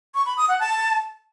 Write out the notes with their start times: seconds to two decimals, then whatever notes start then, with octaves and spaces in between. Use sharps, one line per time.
0.14 C#6
0.26 B5
0.37 D#6
0.49 F#5
0.60 A5